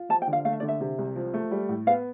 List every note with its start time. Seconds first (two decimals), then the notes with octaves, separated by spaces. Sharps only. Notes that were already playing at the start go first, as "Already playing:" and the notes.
Already playing: F4
0.09 F3 A5
0.22 G5
0.27 D3
0.33 F5
0.45 A3 F5
0.53 E5
0.60 D3 D5
0.68 E5
0.80 C3
0.98 C2
1.16 F3
1.34 A3
1.51 G3
1.69 A2
1.87 B3 F5